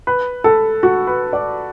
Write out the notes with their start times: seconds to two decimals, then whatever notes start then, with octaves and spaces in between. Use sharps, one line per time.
0.07 B4
0.44 A4
0.83 F#4
1.07 B4
1.33 D5